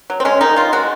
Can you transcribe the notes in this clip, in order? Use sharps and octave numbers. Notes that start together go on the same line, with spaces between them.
F#3
C4
G#3 C#4
D#3 D#4
D#3 F4
G#3 F#4